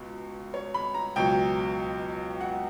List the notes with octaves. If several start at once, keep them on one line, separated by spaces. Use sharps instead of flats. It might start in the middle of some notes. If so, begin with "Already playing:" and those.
Already playing: C#2 B2
C#5
B5
A#5
C#2 B2 F#3 G5
F#5